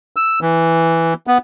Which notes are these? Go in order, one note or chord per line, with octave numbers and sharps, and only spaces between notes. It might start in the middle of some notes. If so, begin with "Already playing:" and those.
E6
E3
B3